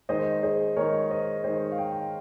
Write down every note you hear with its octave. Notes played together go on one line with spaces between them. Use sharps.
D#3 G#3 D#4 C5 D#5
G#4 C5
D#3 G#3 D#4 A#4 C#5
C5 D#5
D#3 G#3 D#4 C5 D#5
F5
D#5 G5